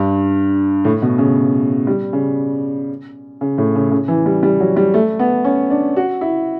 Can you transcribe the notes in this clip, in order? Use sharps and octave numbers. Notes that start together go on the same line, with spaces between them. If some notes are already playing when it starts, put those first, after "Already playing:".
Already playing: G2
A2
B2
C#3
G3
C#3
C#3
A2
C#3
C#3
E3
G3
G3
F#3
G3
A3
B3
C#4
D4
F#4
E4